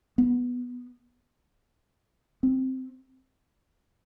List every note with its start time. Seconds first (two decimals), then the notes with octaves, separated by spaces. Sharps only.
0.18 B3
2.43 C4